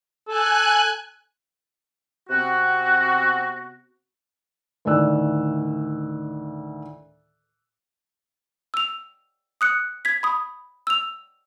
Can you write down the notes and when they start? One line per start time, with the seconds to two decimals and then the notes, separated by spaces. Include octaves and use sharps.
0.28 A4 G#5 F#6
2.29 C3 B3 C4 F#4
4.85 D2 A2 D#3 D5 E6 F#6
8.74 E6 F7
9.61 D#6 F#6 C#7
10.05 G#6 B6
10.23 B5 D#6
10.87 E6 F7